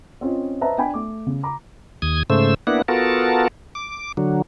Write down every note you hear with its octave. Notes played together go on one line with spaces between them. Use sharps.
C4 C#4 F4 D#5
B4 C5 D#5 E5 A5 A#5
D4 G5 G#5 B5
A3 D6
C#3
A#5 B5 D6
D#2 D#6 G#6
G#2 C#3 A3 C5 E6
A#3 B3 D4 E4 F#5
B3 F4 F#4 A4 A#4 A5
D6
D3 F#3